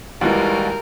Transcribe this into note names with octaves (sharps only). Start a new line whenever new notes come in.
D#2 E3 G3 G#3 F4 F#4 A#4